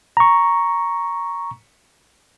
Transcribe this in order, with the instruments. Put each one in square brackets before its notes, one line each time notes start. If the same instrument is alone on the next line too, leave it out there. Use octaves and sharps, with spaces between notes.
[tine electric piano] A#5 C#6